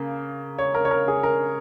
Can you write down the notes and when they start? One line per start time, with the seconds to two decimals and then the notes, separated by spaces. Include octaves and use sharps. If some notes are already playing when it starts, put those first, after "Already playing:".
Already playing: C#3 A#3
0.59 C#5
0.74 A#4
0.85 C#5
0.91 A#4
1.08 G#4
1.23 A#4